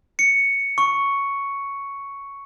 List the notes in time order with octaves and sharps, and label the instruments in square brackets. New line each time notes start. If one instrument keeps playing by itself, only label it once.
[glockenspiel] C#7
C#6